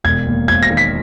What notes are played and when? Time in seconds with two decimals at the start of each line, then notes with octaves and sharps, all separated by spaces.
0.04 E1 G#6
0.27 D#2
0.48 E1 G#6
0.63 A#6
0.71 D#3
0.77 B6